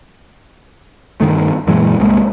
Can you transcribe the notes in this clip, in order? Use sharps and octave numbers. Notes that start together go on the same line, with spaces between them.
G2 D#3 A3
F#2 A#2 E3 G#3
C2 C3 G#3 A#3